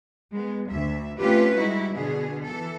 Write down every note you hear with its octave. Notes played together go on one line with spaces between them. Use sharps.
G#3 B3
D2 E5
A3 C4 C#4 F4 G4 B4
G3 G#3 D#4 E4 F#4
B2 D3 B3 G#4
E3 A4